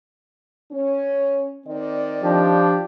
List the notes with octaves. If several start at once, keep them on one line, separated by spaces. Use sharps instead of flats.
C#4
D#3 C4 D5
F3 D4 G4